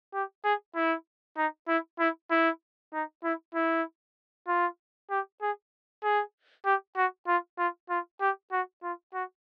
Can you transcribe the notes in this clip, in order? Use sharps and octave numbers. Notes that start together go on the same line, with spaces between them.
G4
G#4
E4
D#4
E4
E4
E4
D#4
E4
E4
F4
G4
G#4
G#4
G4
F#4
F4
F4
F4
G4
F#4
F4
F#4